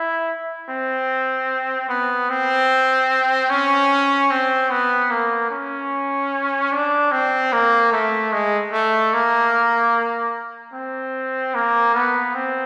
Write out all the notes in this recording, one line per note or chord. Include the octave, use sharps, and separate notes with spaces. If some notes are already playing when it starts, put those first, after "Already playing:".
Already playing: E4
C4
B3
C4
C#4
C4
B3
A#3
C#4
D4
C4
A#3
A3
G#3
A3
A#3
C4
A#3
B3
C4